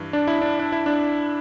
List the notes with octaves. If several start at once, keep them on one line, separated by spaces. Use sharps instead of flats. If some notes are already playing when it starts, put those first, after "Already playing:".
Already playing: G2 E3
D4
E4
D4
D4
E4
D4